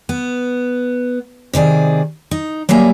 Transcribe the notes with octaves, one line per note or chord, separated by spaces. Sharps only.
B3
C3 D#3 G#4 D5
D#4
F#3 G3 A#3 E5 G#5